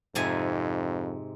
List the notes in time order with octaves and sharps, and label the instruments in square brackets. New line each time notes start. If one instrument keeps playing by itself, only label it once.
[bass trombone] F2 [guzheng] G#2 C3 G#5